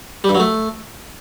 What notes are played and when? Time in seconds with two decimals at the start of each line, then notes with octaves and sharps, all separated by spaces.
0.24 G3
0.29 G2
0.35 F#3
0.40 A3